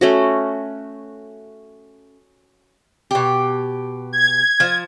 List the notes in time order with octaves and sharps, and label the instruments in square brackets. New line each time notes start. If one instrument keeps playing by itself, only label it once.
[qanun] A3 C#4 F#4
[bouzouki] B2 G4
[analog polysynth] G#6
[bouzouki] F3